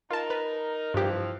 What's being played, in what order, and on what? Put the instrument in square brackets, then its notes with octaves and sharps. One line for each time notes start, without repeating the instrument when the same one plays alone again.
[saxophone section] D#4 A#4 [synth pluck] F4 A5
[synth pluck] B4
[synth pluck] G2 G4 [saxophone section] C3 E3 F3